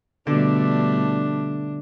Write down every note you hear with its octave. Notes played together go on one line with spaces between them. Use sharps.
B2 D3 G3 A3 D4